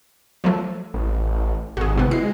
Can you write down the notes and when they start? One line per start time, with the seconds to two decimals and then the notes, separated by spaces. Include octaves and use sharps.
0.44 F3 F#3 A3
0.94 A1
1.77 G#1 F#4 G#4
1.96 G#2 C3 B3
2.11 G#3 E4 C7